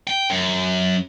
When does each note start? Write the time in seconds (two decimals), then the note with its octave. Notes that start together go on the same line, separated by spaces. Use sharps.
0.07 G5
0.30 F#2